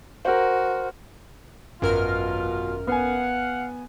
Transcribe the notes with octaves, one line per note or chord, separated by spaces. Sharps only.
F#4 A#4 C5
G#1 F#2 B2 F4 A#4 F6
B3 F5 F#5 G#5